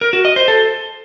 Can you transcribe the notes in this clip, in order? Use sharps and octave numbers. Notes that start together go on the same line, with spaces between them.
A#4
F#4
D#5
C5
A4